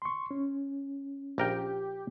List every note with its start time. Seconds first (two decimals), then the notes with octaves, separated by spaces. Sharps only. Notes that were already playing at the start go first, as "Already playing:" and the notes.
0.02 C6 C#6
0.31 C#4
1.38 A#1 G4 A#4 G5